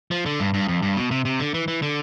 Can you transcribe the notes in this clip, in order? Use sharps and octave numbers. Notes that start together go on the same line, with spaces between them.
F3
D3
G2
G2
F2
G2
B2
C3
C3
D3
E3
E3
D3